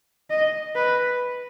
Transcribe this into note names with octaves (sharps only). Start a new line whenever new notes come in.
D#5
B4